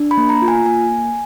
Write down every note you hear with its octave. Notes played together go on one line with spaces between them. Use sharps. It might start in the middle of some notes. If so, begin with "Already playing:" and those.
Already playing: D4
B5
A#3
A#5
F4
G#5
A#3 G#5